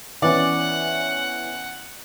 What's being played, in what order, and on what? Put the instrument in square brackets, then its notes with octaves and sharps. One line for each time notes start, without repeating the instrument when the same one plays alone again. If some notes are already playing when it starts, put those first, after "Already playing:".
[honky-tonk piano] E3 B3 C#4 [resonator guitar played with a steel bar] D5 [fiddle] F#5